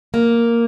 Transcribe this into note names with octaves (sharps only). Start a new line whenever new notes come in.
A#3